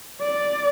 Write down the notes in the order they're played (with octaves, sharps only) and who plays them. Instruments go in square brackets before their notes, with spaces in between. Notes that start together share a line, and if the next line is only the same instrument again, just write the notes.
[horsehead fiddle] D5